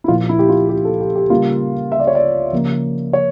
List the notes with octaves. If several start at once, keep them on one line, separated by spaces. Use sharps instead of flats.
E4
A#2 F3 A#3 F4
E4
G4
F4
G4
A4
G4
G4
C#3 G3 A#3 F4
E5
D5
C#5
D5
C#3 F3 A#3
C#5